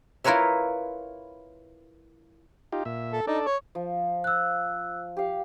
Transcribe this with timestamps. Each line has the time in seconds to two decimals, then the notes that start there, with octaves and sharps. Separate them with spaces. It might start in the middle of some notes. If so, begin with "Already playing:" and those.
0.24 E4 F4 A#4 B4 C#5 E5
2.72 D#4 F4 G4
2.85 A#2 E5
3.13 A4
3.27 D4 D#4 A4 D5
3.46 C#5
3.75 F3
4.24 E6 F#6
5.17 G4 F5